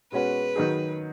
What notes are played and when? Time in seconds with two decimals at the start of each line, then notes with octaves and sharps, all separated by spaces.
0.12 B2 G#3 C#4 F#4 B4
0.56 D#3 F#3 D#4 G#4